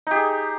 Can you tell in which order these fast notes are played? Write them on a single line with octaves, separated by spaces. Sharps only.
D#4 G4 G#4